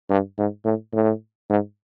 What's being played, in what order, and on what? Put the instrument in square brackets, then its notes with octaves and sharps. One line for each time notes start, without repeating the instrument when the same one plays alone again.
[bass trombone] G2
G#2
A2
A2
G#2